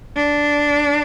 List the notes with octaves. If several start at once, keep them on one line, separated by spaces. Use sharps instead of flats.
D4